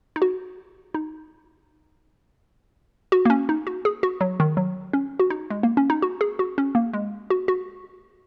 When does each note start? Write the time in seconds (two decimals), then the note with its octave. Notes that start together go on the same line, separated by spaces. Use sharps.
0.16 D#4
0.22 F#4
0.94 D#4
3.12 F#4
3.25 A#3
3.30 C#4
3.49 D#4
3.67 F#4
3.85 G#4
4.03 F#4
4.21 F#3
4.40 D#3
4.57 F#3
4.93 C#4
5.20 F#4
5.30 D#4
5.50 G#3
5.63 A#3
5.77 C#4
5.90 D#4
6.02 F#4
6.21 G#4
6.39 F#4
6.58 C#4
6.75 A#3
6.94 G#3
7.30 F#4
7.48 F#4